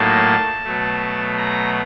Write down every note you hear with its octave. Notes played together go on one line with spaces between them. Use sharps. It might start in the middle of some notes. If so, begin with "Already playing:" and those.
Already playing: A2 F#3 A#3 D#4 A5
B2 F#3 A3
A#5